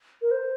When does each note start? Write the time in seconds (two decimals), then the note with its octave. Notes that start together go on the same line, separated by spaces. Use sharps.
0.22 A#4
0.31 C5